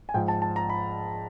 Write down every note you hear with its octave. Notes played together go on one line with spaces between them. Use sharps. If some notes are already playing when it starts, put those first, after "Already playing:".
G#5
G#2 F3 G5
A5
A5
A#5
B5